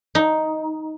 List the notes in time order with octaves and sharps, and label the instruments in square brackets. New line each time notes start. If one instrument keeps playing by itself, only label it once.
[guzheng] D#4